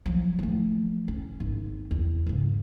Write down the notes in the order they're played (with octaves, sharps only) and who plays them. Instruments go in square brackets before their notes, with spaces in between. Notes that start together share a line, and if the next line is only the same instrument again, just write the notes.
[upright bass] F3 F#3
F3 A3
C#4
G#1 G#2
E2
G#2 C#3